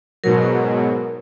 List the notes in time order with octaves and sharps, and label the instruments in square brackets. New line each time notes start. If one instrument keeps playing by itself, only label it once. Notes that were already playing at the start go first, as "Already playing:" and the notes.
[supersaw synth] G#2 B2 F#3 [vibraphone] A#4